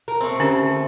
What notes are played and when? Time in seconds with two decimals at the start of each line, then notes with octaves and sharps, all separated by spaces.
0.08 A#4
0.21 A3 C4
0.39 D3 C#4 G4